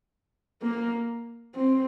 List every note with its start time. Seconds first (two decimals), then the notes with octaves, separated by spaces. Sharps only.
0.62 A#3
1.56 C4